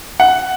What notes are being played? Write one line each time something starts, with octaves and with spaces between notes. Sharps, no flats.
F#5